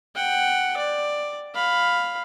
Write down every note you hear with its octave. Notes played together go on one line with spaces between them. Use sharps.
F#5 G5
D5
F5 B5